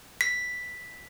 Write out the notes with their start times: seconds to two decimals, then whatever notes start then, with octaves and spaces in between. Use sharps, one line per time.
0.21 B6